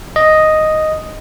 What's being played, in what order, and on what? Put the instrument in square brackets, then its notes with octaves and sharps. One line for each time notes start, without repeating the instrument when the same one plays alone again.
[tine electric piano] D#5